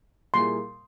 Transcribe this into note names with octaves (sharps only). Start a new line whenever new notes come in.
A#2 G3 A#3 E4 G#4 C6